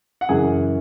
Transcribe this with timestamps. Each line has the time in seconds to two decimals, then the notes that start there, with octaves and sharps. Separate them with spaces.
0.21 F#5
0.29 F#2 C#3 E3 G#4 G#5